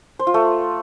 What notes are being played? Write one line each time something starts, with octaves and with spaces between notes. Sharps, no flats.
C5
F4
A3